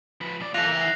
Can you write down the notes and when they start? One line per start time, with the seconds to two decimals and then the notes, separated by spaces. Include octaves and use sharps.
0.21 F3 B4
0.40 B2 D5
0.54 E3 F4 A4 F#6 A#6 F7
0.68 E4 A#4
0.79 A#6 C7